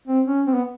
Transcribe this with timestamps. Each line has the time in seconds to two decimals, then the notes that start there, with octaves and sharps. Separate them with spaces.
0.08 C4
0.28 C#4
0.47 C4
0.54 B3